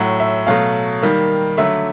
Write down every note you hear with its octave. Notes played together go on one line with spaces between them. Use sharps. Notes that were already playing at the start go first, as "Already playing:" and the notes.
Already playing: A2 F#3 A3 E5 F#5
E5
B2 F#3 A3 F5
D#3 G3 A#3
D3 F#3 A3 E5